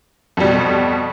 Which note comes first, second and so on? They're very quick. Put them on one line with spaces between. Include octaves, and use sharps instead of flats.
F2 G3 B2